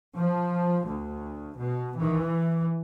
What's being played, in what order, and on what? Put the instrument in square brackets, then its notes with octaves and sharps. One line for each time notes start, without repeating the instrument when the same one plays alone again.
[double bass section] F3
D2
B2
E3